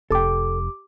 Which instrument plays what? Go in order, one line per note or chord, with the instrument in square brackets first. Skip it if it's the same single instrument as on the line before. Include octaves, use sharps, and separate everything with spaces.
[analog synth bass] F1 [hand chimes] G4 D6 [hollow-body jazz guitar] A4 G5